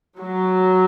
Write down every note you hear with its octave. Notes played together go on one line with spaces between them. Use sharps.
F#3